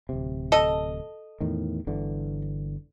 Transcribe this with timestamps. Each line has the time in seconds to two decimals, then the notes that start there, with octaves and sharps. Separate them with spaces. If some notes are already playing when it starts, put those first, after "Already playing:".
0.09 D1 C3
0.52 A4 D#5
1.41 E2 A2 D#3
1.87 G1 D3 E3